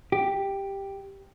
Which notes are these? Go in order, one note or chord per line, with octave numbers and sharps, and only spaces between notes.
G4